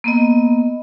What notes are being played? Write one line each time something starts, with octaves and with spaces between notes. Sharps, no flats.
A#3 B3 D#5